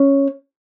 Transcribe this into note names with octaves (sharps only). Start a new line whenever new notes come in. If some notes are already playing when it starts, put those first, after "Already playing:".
Already playing: C#4